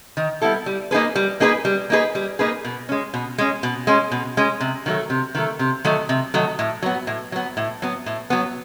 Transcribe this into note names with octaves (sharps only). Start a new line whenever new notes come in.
D#3
G3 B3 E4 A4
G3
A#3 D#4 G#4 B4
G3
A#3 D#4 G#4 B4
G3
A#3 D#4 G#4 B4
G3
A#3 D#4 G#4 B4
B2
G#3 C#4
B2
G#3 C#4
B2
G#3 C#4
B2
G#3 C#4
C3
D#3 F#3 A3
C3
D#3 F#3 A3
C3
D#3 F#3 A3
C3
D#3 F#3 A3
A2
F#3 B3
A2
F#3 B3
A2
F#3 B3
A2
F#3 B3